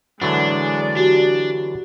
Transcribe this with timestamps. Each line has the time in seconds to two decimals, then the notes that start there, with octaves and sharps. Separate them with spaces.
0.22 D3 E3 F#3 G#3 D4 D5
0.97 D4 F#4 G4